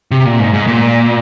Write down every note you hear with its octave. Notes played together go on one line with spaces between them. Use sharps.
C3
A#2
G#2
G#2
A#2